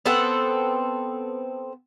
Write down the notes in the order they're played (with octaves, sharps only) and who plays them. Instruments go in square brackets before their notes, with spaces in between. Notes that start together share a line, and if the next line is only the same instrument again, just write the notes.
[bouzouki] B3 C4 A4 F#5